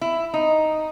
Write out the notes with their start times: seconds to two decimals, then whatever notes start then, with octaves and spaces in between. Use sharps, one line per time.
0.01 E4
0.34 D#4